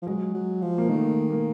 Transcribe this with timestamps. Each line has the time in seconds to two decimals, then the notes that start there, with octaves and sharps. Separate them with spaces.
0.02 F3
0.07 F#3 G#3
0.34 F#3
0.62 F3
0.78 A#3
0.89 D#3 A3
1.30 A#3